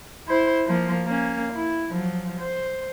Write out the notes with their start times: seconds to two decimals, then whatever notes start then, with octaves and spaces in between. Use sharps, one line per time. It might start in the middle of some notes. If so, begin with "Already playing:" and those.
0.27 E4 C5
0.66 F3 A#3
1.05 A#3 C#4
1.53 E4
1.90 F3 F#3
2.40 C5